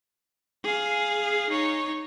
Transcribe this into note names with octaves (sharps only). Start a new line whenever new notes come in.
G#4 F5
D#4 C#5